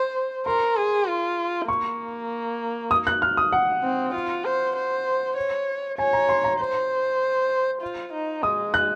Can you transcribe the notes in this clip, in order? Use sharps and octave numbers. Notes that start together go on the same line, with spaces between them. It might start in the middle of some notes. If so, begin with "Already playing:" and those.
Already playing: C5
A#4 C6
G#4
F4
A#3 C#6
D#6
F#6
F6
D#6
F#5
C4
F4
C5
C5
C#5
C#5 G#5
A#5
C6
A#5
C5
F4
D#4
G#3 D#6
F#6